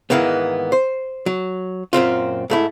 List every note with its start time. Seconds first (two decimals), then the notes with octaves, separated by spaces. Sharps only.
0.10 G#2 D#3 E3 A#3 B3
0.72 C5
1.26 F#3
1.93 F#2 A#2 C4 F4
2.50 G#2 A3 E4